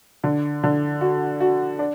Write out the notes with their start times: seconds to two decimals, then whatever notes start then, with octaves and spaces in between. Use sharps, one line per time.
0.24 D3
0.63 D3
1.01 F#4
1.41 F#4
1.79 D4